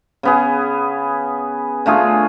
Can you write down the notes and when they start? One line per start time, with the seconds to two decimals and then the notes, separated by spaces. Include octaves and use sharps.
0.23 C#3 B3 G#4
1.86 D3 A3 F4 G#4